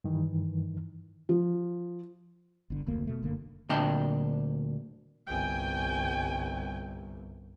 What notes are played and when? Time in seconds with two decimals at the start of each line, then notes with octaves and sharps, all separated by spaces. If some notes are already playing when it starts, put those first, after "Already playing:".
0.04 G2 D#3 E3
1.29 F3
2.70 G1 D3
2.87 F1 D2 A#3
3.07 B2 A3
3.22 F#1 D3 A#3
3.70 D2 A#2 D4 D#5 G5
5.28 G1 C2 G5 G#5